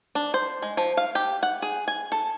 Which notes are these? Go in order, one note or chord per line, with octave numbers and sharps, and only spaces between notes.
D4
C5
G#3
F3
F5
G4
F#5
G#4
G#5
A4